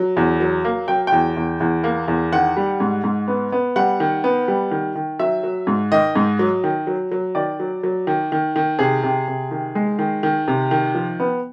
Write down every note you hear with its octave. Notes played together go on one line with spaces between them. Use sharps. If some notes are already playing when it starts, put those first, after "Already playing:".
Already playing: F#3
E2
F#3
A#3
F#3 G5
E2 G5
E2
E2
A#3
E2
D#3 F#5
G3
G#2
G#2
B3
B3
G3 F#5
D#3
B3
G3
D#3
D#3
F#3 E5
F#3
G#2
D#3 D#5
G#2
F#3
D#3
F#3
F#3
D#3 D5
F#3
F#3
D#3
D#3
D#3
C3 G#4
C3
C3
D#3
G#3
D#3
D#3
C3
D#3
F3
B3